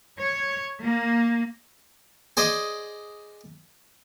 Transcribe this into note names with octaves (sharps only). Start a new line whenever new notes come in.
C#5
A#3
G#4 C5 D5 D#5 G#5